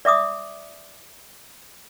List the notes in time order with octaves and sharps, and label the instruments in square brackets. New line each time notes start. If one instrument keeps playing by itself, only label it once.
[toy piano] D5 E5 D6 D#6